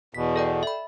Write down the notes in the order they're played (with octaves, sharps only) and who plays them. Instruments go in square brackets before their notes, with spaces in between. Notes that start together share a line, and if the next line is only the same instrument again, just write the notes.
[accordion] E2 B2 [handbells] B6
[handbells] A4 D5 G5
E5 B5